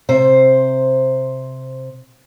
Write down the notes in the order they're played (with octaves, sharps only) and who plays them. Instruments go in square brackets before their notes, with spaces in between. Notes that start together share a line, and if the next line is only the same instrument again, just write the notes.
[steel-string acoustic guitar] C3 C5